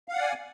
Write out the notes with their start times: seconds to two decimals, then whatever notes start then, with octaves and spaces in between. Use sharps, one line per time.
0.08 F5
0.13 F#5
0.17 D5
0.22 G#5